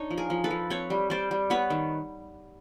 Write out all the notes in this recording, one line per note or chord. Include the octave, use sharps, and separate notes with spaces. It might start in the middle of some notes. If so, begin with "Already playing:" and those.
Already playing: D4 D#4 C#5 D#5
F3
G#4 A#4
F3
A4 B4
F3
C4 B4 C#5
G3
G3 C5 D5
G3
B3 B4 C#5
D#3